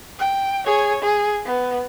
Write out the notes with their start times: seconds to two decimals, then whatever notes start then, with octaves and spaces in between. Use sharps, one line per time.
0.19 G5
0.66 G#4 C#5
1.02 G#4
1.45 B3